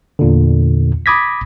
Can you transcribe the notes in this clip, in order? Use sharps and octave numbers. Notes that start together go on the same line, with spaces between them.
E2 A#2 D3
B5 D6 D#6 G#6 A#6 B6